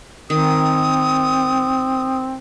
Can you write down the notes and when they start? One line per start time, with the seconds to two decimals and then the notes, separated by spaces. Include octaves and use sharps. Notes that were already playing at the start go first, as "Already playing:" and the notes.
0.30 D#3 C4 D#6